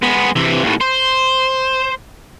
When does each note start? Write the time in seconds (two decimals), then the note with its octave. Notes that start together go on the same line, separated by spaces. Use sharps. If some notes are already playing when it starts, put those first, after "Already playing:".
0.03 G#3 B3
0.36 C3 E3
0.63 D#2 A2
0.81 C5